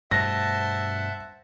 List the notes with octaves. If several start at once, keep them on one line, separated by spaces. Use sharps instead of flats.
G2 B2 A3 C5 E5 F#5 A5 A#6